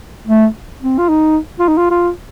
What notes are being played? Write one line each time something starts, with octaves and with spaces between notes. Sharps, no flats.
A3
C4
F4
D#4
F4
D#4
F4
F4